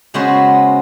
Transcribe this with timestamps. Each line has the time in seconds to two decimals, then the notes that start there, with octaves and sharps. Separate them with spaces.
0.14 C#3 G#3 B3 F#4 B4 C5